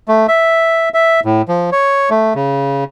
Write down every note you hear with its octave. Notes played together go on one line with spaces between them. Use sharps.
A3
E5
E5
A2
F3
C#5
A3
C#3